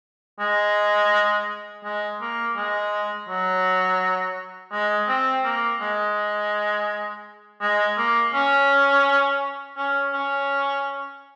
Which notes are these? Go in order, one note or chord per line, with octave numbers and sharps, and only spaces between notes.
G#3
G#3
A#3
G#3
F#3
G#3
C4
A#3
G#3
G#3
A#3
C#4
C#4
C#4